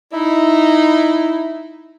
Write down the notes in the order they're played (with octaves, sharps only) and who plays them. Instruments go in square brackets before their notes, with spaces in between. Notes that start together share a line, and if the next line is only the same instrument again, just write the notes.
[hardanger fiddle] D#4 [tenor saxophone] E4